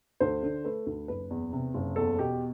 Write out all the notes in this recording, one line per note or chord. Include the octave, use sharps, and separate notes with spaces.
D2 C5
D3
A3 B4
D2
F#1 B4
E2
C3
F#1
E2 A4
B2 G4